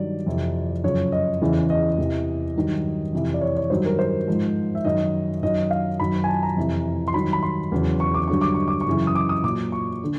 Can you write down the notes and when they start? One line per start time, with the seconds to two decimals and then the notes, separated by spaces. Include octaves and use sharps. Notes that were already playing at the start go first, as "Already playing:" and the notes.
Already playing: G2 D#3 F#3 D5
0.26 F2 C3 E3
0.84 F#2 C#3 F3 C#5
1.12 D#5
1.42 E2 C#3 E3
1.70 D#5
1.98 E2 C3 E3
2.56 G2 D#3 F#3
3.13 F2 C3 E3
3.34 D5
3.41 C#5
3.57 C#5
3.70 G2 D#3 F#3 C5
3.85 A#4
3.99 C5
4.28 G#2 F3
4.75 E5
4.85 F#2 D#3 F#3 D#5
5.42 F#2 D#3 F#3 D#5
5.71 F5
6.00 F#2 D#3 F#3 B5
6.24 G#5
6.28 A5
6.43 A#5
6.57 F2 C3 E3
7.08 C6
7.14 G2 D#3 F#3 B5
7.33 B5
7.43 C6
7.72 E2 C#3 F#3
8.00 C#6
8.14 D6
8.28 G2 D3 F#3 C#6
8.41 D6
8.54 C#6
8.68 D6
8.81 C#6
8.87 F#2 C#3 E3
9.07 D#6
9.15 D6
9.29 D#6
9.43 A#2 F#3 D6
9.72 C#6
10.04 D3